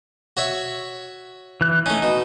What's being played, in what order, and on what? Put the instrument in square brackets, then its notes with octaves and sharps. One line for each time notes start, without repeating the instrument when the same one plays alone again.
[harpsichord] F#4 C#5 E5
[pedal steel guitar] E3 F#6
[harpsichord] A3 C#4 [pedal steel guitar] D#4
[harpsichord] B2